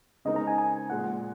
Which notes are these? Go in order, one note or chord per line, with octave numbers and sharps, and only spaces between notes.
C#3 G#3 C4 D#4 A#4 D#5
A#5
G#5
G#5
A#2 F3 G#3 F#5